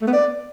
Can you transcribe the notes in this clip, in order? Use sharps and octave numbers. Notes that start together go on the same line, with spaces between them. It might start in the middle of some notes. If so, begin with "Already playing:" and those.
A3
B3
D5